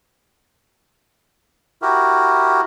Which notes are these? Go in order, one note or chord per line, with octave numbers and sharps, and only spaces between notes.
E4 F#4 G4 A#4